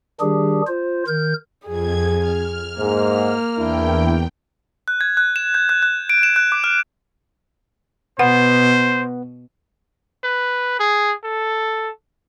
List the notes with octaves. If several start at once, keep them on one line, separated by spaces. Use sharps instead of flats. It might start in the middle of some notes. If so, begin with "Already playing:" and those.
D#3 G3 D4 G4 G#4
F4 C5
D#3 A#4 G6
F2 G#4 G#6
F6
G#2 A#3
E2 D4 E4 A#4 G5
F#6
G#6
F#6
E7
G6
F#6
F#6
D7
E7
F#6
D6
F6
B2 B3 C5 F#5
B4
G#4
A4